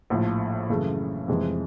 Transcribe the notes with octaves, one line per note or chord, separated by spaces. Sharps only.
A#1 A2 F3
F#2 C#3 E3 A3
F1 F2 C3 E3 G#3